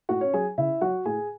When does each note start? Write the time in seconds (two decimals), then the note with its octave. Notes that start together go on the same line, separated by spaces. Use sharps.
0.09 A2 F#4 F#5
0.21 C#4 C#5
0.33 F#3 G#4 G#5
0.58 C#3 E4 E5
0.81 F#3 F#4 F#5
1.05 A2 G#4 G#5